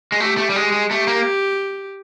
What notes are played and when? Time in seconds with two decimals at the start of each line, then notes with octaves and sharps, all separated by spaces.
0.12 G#3
0.20 A3 G4
0.37 A3
0.50 G3
0.56 G#3
0.72 G#3
0.90 A3 G4
1.08 A#3